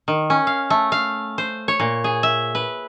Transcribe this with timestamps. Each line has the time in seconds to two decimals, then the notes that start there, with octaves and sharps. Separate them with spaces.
0.08 D#3
0.30 C#4
0.47 F5
0.70 A3
0.92 F5
1.38 C5
1.68 C#5
1.80 A#2
2.04 G#4
2.23 E5
2.55 B4